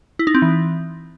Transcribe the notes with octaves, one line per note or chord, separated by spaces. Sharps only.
E4
D#4
C4
E3